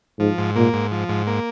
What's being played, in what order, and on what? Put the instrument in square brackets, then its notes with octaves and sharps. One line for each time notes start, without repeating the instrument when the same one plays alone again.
[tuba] G#2 [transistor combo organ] F3
[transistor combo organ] G#2
[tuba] A#2 [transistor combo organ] A#3
[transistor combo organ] G#2
F3
G#2
A#3